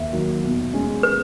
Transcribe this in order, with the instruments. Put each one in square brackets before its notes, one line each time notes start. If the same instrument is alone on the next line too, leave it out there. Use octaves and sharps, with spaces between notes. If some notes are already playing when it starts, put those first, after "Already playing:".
Already playing: [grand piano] D#2 [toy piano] E5
[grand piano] D#3 F#3
B2
G#3 C#4
[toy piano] B4